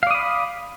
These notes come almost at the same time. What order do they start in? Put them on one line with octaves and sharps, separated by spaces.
F5 D5 D#6 B5